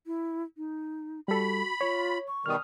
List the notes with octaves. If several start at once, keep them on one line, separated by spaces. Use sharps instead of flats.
E4
D#4
G3 F#4 A4 B5
F4 C#5
C#6
B2 D#3 G3 D#6 F6